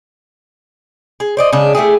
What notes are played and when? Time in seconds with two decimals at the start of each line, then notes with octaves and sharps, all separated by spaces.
1.20 G#4
1.37 C5 D5 D#5
1.53 C#3 G#3 D4
1.75 A3 E4 G4 G#4